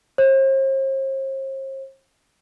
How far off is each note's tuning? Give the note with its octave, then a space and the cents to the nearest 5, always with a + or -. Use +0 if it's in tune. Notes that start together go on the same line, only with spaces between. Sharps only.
C5 +45